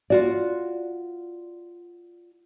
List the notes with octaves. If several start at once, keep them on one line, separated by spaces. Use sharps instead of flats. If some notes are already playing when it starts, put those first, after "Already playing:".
F4 F#4 D5